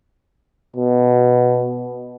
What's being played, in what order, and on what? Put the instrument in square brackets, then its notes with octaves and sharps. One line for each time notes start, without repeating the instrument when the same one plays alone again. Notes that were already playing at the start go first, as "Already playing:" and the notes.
[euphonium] B2